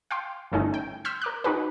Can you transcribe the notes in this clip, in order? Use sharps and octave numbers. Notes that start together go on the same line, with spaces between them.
F5 G5 C6
G1 A3 C#4 D#4
G5
C6 E6 F6 G6 B6
A#4 D6 F#6
D#4 F#4 G#4 B4